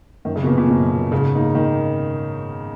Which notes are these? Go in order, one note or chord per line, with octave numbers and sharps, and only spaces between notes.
F#2 D#3
C#3
B2
A#2 F3 B3
A#2
F#2 B2
F3 B3
G#2 C#3
D#3 A#3 D#4
D#3